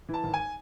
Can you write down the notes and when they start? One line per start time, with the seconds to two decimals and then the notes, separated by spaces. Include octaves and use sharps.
0.09 E3
0.14 A5
0.24 G#1
0.34 G#5